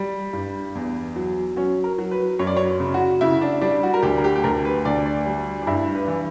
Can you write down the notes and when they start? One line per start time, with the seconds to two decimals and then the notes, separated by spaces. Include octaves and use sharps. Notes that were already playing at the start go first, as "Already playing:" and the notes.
Already playing: G3
0.33 G2
0.75 E2
1.16 F#3
1.56 F#3 C#4
1.84 A#4
1.98 F#3
2.11 B4
2.39 F#2 C#5
2.47 D5
2.57 C#5
2.80 C#3
2.94 F#4
3.21 C#3 E4
3.41 D4
3.61 G3 D4
3.83 F#4
3.94 A#4
4.02 D2 G4
4.18 A#4
4.24 G4
4.36 G4
4.44 D2 A#4
4.65 B4
4.85 D2 D5
5.06 D5
5.26 G3
5.62 D4
5.67 G2 E4
5.95 B4
6.08 E3